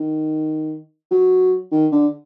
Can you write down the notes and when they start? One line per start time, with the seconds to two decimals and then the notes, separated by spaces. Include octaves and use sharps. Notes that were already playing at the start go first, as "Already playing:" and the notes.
Already playing: D#3
1.11 F#3
1.72 D#3
1.92 D3